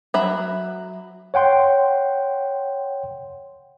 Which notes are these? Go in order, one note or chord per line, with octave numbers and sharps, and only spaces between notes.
F#3 E5 B5
C#5 F#5 G5 C6